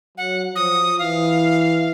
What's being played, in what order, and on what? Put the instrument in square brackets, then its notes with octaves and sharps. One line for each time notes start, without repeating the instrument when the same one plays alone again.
[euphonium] F#3 [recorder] F#5
[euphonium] F3 [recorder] D#6
[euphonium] E3 [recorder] F5